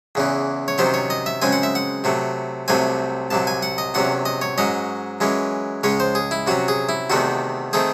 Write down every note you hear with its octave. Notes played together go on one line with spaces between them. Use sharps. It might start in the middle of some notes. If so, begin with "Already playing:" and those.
E2 C#3 E3
C#5
C3 D#3 F#3 C#4 C5
C#5
D#5
E5
F#2 C#3 G#3 C4 G#5
F#5
E5
F#5
C3 F#3 A3
C2 C3 F#3 A3 C4 G#5
C2 C3 F#3 A5
G#5
F#5
D#5
E2 C3 F#3 C#4 F#5
D#5
C#5
G#2 F#3 C#4 D#5
F#2 E3 G#3 C#4
C#2 C#3 G#3 C#4 C#5
C5
G#4
E4
C3 F#3 C#4 F#4
G#4
E4
E2 C3 D#3 A3 C4 F#4
D#3 A3 C4 G#4